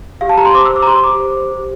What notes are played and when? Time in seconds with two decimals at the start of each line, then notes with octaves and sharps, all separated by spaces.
0.21 G4 F5
0.29 A5
0.38 G4 A#5
0.46 C6
0.54 C5 D6
0.66 E6
0.70 C5
0.76 D6
0.83 A#5
0.87 G4 C6
1.04 G4 D6
1.20 C5
1.37 C5
1.52 G4